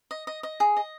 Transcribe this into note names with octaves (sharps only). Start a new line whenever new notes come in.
D#5
D#5
D#5
G#4
D#5